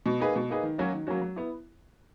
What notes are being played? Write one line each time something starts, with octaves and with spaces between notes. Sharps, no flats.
B2
A#3 D#4 G#4 B4
B2
A#3 D#4 G#4 B4
D#3
F#3 A#3 C#4 F#4
D#3
F#3 A#3 C#4 F#4
F#3
B3 E4